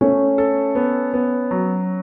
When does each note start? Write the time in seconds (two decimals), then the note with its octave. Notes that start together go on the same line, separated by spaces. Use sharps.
0.01 A3 C#4
0.38 A4
0.75 B3
1.14 B3
1.51 F#3